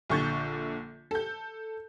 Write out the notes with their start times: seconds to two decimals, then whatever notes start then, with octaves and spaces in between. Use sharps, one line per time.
0.10 A#1 D3 C#6 G6 A6
1.11 A4 G6